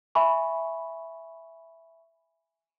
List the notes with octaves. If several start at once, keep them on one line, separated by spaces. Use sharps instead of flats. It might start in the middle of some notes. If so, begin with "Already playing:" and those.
E5 G#5 B5 C#6